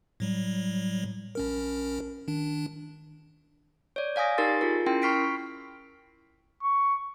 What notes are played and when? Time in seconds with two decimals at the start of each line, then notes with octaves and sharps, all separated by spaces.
0.20 A2 F#3 G3
1.35 A#1 C#4 A#4
2.28 D#3 D4
3.96 C#5 D5
4.16 D5 F5 G#5 D#6 A#6
4.38 D#4 G4 A#4 C6 A6
4.61 F4 G#4 A#4
4.86 C#4 E4 A#4 G5 C6
5.02 B5 C#6 F6 B6 C7 D7
6.63 C#6